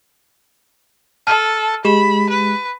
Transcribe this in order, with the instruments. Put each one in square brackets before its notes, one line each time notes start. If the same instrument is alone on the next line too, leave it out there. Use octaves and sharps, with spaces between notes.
[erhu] A4 [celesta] A5 F6 D#7
[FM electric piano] G#3 [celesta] G4 E7 [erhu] B5
[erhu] B4